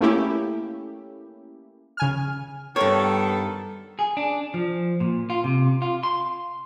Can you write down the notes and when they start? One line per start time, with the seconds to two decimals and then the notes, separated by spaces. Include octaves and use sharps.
0.01 A3 A#3 C#4 E4 G4
1.97 C#3 G#5 F6
2.76 G2 D#3 B3 A4 C#5
3.99 G#4
4.17 D4
4.54 F3
5.00 A#2
5.30 F4
5.44 C3
5.82 F4
6.03 C6